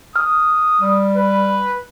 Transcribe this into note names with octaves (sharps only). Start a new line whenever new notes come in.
D#6 F6
G3
B4